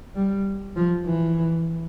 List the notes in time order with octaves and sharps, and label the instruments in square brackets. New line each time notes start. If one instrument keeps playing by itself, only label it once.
[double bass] G3
F3
E3